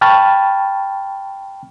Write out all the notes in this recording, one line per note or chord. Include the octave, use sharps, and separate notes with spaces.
G5 A5 B5 C#6 F6 A6